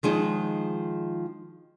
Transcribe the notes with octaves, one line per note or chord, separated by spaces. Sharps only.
D#3 F3 G#3 D#4